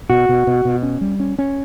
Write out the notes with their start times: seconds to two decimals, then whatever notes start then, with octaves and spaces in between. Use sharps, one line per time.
0.10 B2 F#4
0.29 B2
0.47 B2
0.65 B2
0.83 C#4
1.01 G3
1.20 C#4
1.38 C#4